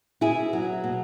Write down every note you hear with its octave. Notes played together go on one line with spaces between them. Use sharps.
B2 E4 G#4
F#3
B2